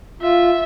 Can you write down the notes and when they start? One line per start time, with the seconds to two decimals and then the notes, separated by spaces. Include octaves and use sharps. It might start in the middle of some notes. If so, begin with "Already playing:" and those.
0.22 F4 E5